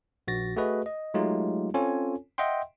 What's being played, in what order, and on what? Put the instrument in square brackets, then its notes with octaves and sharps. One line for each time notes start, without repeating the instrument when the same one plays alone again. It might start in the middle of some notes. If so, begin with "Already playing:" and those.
[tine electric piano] A#1 F#4 A6 A#6
A3 F#4 G#4 B4 D#5
D#5
F#3 G#3 A3 D#4 F4 G4
C4 C#4 F4 A4 C#5 G#5
D#5 E5 F#5 G5 C6